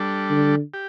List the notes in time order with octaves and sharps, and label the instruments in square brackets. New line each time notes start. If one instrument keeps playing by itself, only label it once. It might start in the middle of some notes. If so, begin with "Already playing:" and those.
Already playing: [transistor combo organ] G3 D4 A4
[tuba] D3
[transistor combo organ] G4